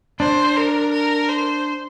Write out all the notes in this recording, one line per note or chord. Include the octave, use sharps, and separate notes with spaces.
D4 C5
A#4
A#4
C5